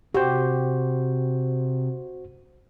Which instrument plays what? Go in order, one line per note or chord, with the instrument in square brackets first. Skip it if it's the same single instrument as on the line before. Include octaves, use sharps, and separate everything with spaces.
[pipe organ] C3 [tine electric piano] F#4 C5 [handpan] G4